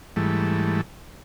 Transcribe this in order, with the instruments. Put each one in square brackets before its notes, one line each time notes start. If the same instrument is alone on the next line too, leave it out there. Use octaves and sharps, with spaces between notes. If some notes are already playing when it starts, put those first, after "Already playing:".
[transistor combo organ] G#2 E3 G3 A3